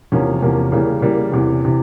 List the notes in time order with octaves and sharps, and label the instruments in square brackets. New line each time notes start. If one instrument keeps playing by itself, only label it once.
[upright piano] E2 C3 F3 A#3 C#4
E2 C3 F3 A#3
C#3 E3 G3 A#3
C#3 E3 G3 A#3
E2 C3 E3
C3 E3